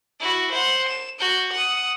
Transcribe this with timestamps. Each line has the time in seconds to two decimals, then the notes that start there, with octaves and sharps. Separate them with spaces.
0.20 E4 F#4
0.52 C5 F#5
0.88 E7
1.19 F#4 G6
1.53 F#5 D#6